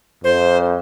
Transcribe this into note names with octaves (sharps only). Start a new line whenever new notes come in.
F2 C5